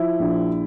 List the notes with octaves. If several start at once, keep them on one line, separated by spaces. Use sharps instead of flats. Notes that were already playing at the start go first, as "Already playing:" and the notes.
Already playing: F3 E4
A#1